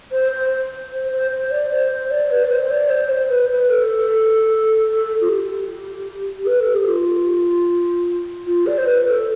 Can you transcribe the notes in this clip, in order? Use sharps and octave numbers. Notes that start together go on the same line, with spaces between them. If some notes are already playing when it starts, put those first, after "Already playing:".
C5
C5
C5
C5
C5
D5
C5
C5
D5
B4
D5
C5
D5
C5
D5
C5
B4
B4
A4
F4
G4
B4
A4
G4
F4
F4
D5
C5
B4
A4